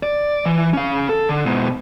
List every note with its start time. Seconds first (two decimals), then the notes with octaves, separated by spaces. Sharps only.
0.03 D5
0.46 E3
0.73 C#4 F5
1.09 A4
1.29 D3
1.45 G#2 B2